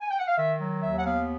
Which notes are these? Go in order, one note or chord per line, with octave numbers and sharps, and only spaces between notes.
G#5
G5
F#5
F5
D#3 E5
F#3
D#2 E5
F#5
B3 F5